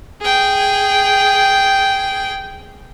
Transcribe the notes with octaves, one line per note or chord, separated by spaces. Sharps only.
G#4 G5